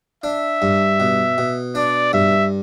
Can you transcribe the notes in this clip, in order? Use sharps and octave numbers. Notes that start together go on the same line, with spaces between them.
D4 E5
G2
B2
B2
D4 D5
G2 E5